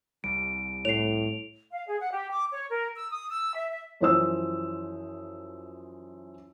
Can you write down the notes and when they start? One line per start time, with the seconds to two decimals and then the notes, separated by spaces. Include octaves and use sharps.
0.24 C2 G3 D7
0.85 A2 C#5 C7 F7
1.72 F5
1.87 G#4
2.00 F#5
2.12 G4
2.31 D6
2.51 C#5
2.70 A#4
2.95 E6
3.11 D#6
3.30 E6
3.55 E5
3.71 E5
4.01 F#2 E3 F3 C5 D#6 E6